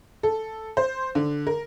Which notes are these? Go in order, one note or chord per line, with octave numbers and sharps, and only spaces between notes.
A4
C5
D3
A#4